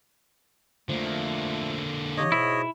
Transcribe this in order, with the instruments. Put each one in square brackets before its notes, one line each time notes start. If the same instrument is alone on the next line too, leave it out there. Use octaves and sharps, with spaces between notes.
[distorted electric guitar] D3 A#3 [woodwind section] F3 A3
[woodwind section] C#3 D#4 G4 [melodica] C#5 D#5
[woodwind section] G#2 B2 [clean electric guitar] E4